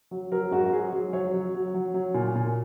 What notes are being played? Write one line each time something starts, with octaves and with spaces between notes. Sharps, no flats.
F#3
F#3 A#4
G#2 F#4
F#3 G#4
F#3
F#3 C#5
F#3
F#3
F#3
F#3
A#2
A#2